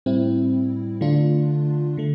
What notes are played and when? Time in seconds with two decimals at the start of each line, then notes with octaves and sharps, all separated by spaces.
0.06 A2 G3 C4 E4
1.01 D3 A3 D4 F4
1.97 D3 A3